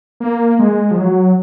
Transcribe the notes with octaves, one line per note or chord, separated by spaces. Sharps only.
A#3
G#3
F3
F#3